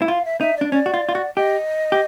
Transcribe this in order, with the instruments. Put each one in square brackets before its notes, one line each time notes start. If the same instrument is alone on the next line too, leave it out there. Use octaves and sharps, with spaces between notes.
[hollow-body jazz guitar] E4
[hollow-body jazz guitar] F4 [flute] F5
[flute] E5
[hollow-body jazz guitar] D#4 [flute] E5
[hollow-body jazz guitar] D4 [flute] D5
[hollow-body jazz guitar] C#4 [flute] D5
[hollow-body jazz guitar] F#4
F4
F4
F#4
[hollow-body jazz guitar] G4 [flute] D#5
[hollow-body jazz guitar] G4